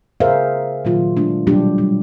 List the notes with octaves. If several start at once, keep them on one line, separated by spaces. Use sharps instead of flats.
C#3 G#4 A#4 C5 E5 F5
A#2 D#3 F#3 F4
G#3 A3 D4
B2 F#3 G3 A3 D4 G4
G3